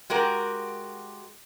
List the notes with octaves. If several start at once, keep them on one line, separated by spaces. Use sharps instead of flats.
G#3 F#4 G4 A#4